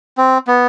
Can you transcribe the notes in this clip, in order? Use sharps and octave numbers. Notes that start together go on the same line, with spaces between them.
C4
B3